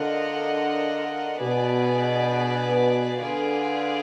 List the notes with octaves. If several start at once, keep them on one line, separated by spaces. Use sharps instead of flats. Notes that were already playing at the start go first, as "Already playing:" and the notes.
Already playing: D3 D4 F4 A#4 D#5 F#5
B2 B3 D4 G#4 B4 D5
D3 F4 G#4 B4 D5